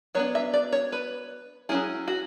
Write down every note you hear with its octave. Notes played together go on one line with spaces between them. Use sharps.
F#3 B3 D4 C#5
E5
D5
C#5
B4
F#3 C#4 E4 G#4
F#4